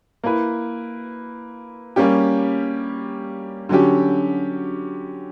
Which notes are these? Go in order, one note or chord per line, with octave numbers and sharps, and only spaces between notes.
A#3 E4 B4
G3 A#3 C#4 G4
D3 F#3 C#4 G4